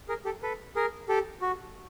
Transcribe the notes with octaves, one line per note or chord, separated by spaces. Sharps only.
G#4 A#4
G4 A4
A4 B4
G#4 A#4
G4 A4
F#4